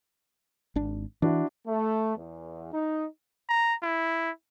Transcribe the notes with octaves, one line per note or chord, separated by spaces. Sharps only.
G#1 D4
E3 D4 E4 F#4
A3
E2
D#4
A#5
E4